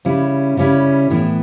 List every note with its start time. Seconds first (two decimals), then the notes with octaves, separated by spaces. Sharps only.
0.05 C#3 G3 C#4 E4
0.57 C#3 G3 C#4 E4
1.10 A2 E3 B3 E4